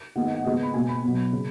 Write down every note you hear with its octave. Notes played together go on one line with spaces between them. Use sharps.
D#3 G#3 B3 F#5
D#5
F#5
C#3 G#3 B3 D#5
B5
B2 G#3 B3 G#5
B5
B2 F#3 B3
C#3